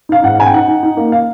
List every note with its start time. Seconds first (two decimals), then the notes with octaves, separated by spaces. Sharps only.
0.09 D#4 F5
0.23 G#2 F#5
0.38 D#4 G#5
0.46 G5
0.54 D#4 F#5
0.68 D#4
0.83 D#4
0.97 A#3
1.12 F5